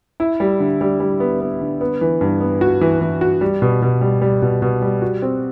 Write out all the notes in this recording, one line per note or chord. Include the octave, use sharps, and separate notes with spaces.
E4
G3
D3
G3
G3
B3
B3
D3
B3
E3
G2
B3
F#4
E3
E3
F#4
G3
B2
B2
G3
G3
B2
B2
G3
F#4
C4